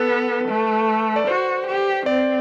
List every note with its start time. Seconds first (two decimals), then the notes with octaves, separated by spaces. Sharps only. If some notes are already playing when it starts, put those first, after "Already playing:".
Already playing: B3 A4 B4
0.48 A3
1.16 D5
1.27 F#4 C5
1.67 G4
2.06 C4 D5